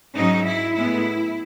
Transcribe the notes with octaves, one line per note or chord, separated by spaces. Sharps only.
G#2 F#3 C#4 D#4
E4
A2 G#3 B3 E4